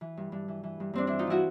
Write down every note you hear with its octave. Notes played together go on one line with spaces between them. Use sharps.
E3
G2
G2
E3
E3
G2
G2 C4 D4
E3 D4 E4
D#4 F4
E3 E4 F#4